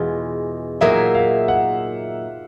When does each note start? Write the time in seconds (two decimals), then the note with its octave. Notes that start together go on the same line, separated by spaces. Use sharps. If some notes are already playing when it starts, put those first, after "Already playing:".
Already playing: E2 B2 G#3 F4
0.81 A#2 F#3 A#3 D#4 G#4 E5
1.15 F5
1.48 F#5